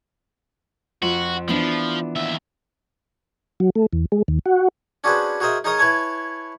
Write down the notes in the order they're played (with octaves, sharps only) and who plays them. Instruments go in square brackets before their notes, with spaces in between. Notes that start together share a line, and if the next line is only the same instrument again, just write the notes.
[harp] F2 [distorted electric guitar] F#4
[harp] E3 B3 D4 [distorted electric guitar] F3
[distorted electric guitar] D#2 E5
[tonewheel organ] F#3
A3
E2
G#3
D#2
F#4
[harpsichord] C#4 D4 F#4 G#4 B4 C5
F#4 G#4 A#4 C5 D#5 E5
D#4 G#4 A#4 C#5 D#5 D#6
E4 B4 C#5 G#5 A5